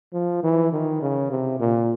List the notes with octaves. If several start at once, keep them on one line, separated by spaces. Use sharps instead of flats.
F3
E3
D#3
C#3
C3
A#2